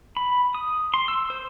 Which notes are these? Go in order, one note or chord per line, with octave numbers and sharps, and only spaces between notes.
B5
D#6
C6
E6
C5